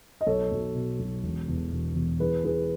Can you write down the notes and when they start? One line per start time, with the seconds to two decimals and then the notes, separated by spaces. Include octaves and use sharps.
0.21 D#5
0.27 B1 A4 C#5
0.52 B1
0.75 B2
0.99 B1
1.23 E1
1.48 E2
1.72 E1
1.96 E2
2.20 E3 G#4 B4
2.44 E3 G#4 B4